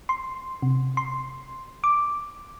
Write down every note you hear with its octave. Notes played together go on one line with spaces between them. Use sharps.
C6
C3
C6
D6